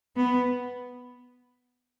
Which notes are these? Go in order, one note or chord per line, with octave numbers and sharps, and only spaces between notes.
B3